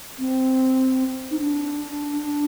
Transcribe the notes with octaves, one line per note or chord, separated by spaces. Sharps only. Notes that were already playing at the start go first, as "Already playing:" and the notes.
C4
D#4
D4